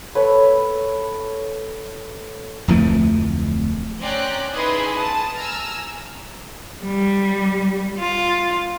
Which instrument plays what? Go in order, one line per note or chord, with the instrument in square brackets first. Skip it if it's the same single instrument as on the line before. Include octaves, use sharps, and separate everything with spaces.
[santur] A4 B4 C#5
[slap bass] D1 F2 E3 A3
[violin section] C4 C#4 D5 G5 A#5 F#6
D#4 E4 G#4 B4 B5 C6
A5 D#6
G#5 A#5 E6 F6
[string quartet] G3
F4